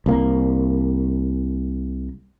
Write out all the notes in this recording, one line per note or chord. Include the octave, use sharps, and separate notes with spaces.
C2 A#3